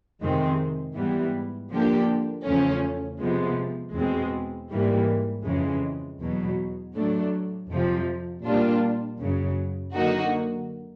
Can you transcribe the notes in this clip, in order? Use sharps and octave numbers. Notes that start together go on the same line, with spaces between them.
F2 C3 D#3 G#3 C4
G#2 E3 G3 B3
D3 F3 A#3 D4 G4
E2 C#3 F3 A3 C#4
C3 F3 G#3 B3
E2 B2 G#3 C4
G#2 E3 G3 A#3
F2 C#3 E3 G#3
E2 B2 F#3
A2 F#3 A3 D4
F2 C3 F3
A#2 G3 A#3 D4 F4
F#2 C#3 F#3
D3 F#3 A#3 D#4 F#4